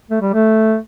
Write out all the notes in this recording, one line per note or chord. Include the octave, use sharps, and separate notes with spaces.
A3
G3
A3